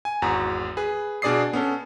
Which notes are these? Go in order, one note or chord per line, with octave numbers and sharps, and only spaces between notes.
G#5
G#1 E2 F#4 A#5
G#4 B4
B2 D4 G#4 D5 D#6 C7
B3 C#4 A4